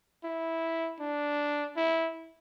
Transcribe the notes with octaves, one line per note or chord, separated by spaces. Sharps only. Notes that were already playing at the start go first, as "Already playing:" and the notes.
E4
D4
E4